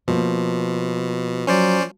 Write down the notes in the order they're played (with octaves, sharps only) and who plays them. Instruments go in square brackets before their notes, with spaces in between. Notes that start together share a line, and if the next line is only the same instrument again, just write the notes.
[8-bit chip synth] B2 [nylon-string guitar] F3 A#3
[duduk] F#3 [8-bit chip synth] C#4 C5 D5